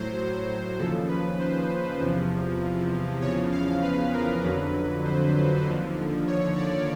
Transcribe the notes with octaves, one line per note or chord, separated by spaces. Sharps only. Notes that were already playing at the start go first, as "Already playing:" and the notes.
Already playing: A2 F#3 C5
D#2 C#3 F3 A4
B4
C5
E2 C3 F3
E2 C#3 F3 C#5
F5
B4
A#4
F2 D3 F#3 B4
C5
D#2 D3 F3
C#5
D5